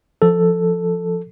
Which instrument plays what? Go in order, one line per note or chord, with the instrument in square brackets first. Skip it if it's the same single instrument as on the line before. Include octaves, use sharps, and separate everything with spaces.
[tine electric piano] F3 A4